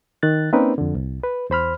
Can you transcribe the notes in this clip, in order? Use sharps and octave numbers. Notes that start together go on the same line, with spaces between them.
D#3 F#6 A6
A#3 C4 C#4 D#4 A#4 B4
F2 D3
C2
B4
E2 C5 B5 F6